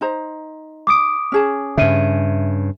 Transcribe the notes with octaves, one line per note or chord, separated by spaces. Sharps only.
D#4 C5 A#5
D6 D#6 D7
C#4 G#4 A5
G2 C#3 E5 D#7